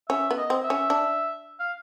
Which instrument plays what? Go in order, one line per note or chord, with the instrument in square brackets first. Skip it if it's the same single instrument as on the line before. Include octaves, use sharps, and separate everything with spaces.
[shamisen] C#4 [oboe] E5
[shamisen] B3
[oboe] D#5
[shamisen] C4
[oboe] E5
[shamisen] C#4
D4
[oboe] F5